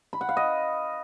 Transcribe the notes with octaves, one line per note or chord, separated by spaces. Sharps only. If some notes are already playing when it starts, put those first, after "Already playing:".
B5
F#5
F5
D#5